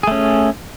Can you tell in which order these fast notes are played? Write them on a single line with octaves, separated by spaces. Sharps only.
G#4 A3 C#4